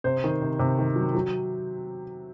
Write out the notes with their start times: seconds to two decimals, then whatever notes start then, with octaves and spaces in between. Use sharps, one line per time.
0.04 C3 C5
0.24 D#3
0.42 C3
0.59 C3
0.79 D#3
0.96 F#3
1.15 F#3